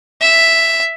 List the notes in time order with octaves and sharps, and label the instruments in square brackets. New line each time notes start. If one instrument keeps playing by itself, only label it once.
[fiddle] E5